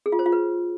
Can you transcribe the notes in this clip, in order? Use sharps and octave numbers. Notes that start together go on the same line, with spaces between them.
G#4
F4
C5
F4
B4